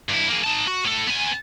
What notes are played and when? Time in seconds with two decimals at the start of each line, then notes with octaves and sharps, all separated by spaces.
0.09 G2 E4
0.29 A#3 G#4
0.45 D#4 A5
0.68 F#4
0.85 A2 A4
1.07 B3 G#5